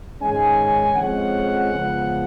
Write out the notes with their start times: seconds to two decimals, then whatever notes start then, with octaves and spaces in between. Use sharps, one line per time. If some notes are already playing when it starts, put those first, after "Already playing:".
0.20 G#2 D#3 G#3 C#4 G#5
0.95 F2 F3 G#3 C#4 F#5
1.69 C#2 C#3 F3 B3